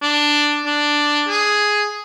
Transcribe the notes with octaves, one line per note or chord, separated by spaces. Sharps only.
D4
D4
G#4